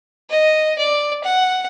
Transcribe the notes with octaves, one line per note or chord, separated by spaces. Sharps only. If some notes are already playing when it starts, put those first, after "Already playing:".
D#5
D5
F#5